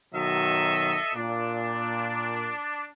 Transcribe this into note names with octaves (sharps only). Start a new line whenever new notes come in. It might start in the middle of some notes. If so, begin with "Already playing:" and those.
B2 D#3 F#3 A4 D#5 E5
A#2 D4